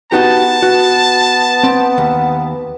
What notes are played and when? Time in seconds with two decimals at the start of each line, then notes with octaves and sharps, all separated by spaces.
0.12 B3 D#4 F#4 G4 A5
0.63 B3 F#4
1.63 C4
1.98 D#2